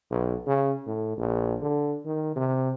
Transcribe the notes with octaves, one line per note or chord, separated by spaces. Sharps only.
B1
C#3
A2
A#1
D3
D#3
C3